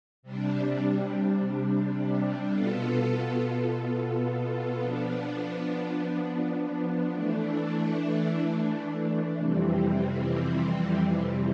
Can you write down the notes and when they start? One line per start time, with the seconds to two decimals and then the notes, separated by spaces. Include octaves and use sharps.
0.23 C3 G3 D4
2.51 B2 B3 F4 A4
4.80 F3 B3 D4
7.08 E3 A3 D4
9.37 F2 C3 E3 G3 C4